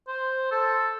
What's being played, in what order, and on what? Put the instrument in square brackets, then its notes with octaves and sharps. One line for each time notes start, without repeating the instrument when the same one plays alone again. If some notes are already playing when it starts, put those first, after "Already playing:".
[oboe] C5
A4